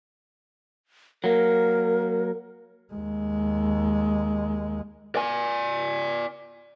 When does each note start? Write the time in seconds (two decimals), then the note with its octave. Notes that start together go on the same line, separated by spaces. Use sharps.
1.24 F#3 A#3 A#4
2.94 D#2 G#3
5.16 D5 G#5